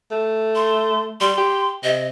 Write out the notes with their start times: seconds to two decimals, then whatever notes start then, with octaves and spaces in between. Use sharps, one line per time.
0.11 A3
0.55 C6
1.21 G3 C6
1.38 G4
1.84 C3 D#5